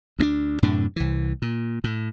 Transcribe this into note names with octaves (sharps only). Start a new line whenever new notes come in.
D2 B3 D4
F#2 A2 C3 D4
C2 E3
A#2
A2